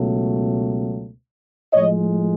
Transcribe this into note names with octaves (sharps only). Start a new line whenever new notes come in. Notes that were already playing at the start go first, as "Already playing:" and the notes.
Already playing: C#2 B2 F#3 A3
A2 F3 G#3 C#5 D#5